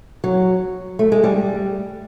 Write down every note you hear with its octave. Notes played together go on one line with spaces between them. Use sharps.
F#3
A3
G#3
G3